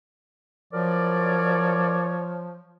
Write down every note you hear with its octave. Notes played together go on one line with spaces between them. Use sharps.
F3 F#3 A#4 C#5 D5